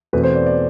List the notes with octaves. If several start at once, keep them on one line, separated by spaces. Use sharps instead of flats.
E2 B2 A3 C4 B4
C5
D5
D5